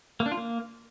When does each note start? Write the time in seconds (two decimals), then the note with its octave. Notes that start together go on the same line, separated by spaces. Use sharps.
0.20 A#3
0.26 D4
0.32 F4
0.37 A#3